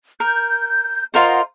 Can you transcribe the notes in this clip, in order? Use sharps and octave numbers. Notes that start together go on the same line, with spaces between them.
A#4 G6
F4 A#4 C5 D#5 F#5